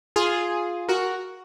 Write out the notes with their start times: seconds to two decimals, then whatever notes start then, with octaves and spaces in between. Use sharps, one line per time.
0.16 F4 G#4
0.89 F#4 A#4